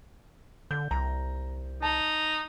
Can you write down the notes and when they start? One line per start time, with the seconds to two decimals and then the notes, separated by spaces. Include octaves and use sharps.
0.71 D3 G6
0.91 C2 A#5
1.82 D#4 A5